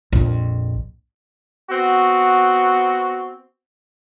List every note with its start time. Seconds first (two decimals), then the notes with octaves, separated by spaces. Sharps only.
0.12 A#1 F2
1.71 B3 C4 F#4